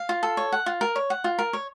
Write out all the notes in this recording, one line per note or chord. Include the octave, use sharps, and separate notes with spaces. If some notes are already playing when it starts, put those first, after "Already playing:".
Already playing: F5
F4
A4
C#5
F#5
F4
A#4
C#5
F#5
F4
A#4
C#5